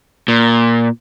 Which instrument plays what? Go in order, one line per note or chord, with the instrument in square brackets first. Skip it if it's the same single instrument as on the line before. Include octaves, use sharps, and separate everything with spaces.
[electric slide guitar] A#2